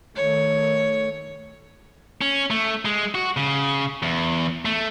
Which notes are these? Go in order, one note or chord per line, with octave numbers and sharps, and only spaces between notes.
D#3 A3 C#5
C#4
A3
G#3
F#4
C#3
E2
A3